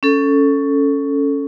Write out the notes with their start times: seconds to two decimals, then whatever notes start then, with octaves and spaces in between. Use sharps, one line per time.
0.03 C#4 A4